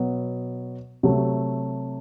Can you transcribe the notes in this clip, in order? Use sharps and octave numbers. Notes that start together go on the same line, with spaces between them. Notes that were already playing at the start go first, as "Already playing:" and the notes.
Already playing: B2 F#3 B3
C3 F#3 A3